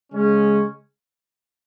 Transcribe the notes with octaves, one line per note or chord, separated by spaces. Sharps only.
C#3 G#3 C#4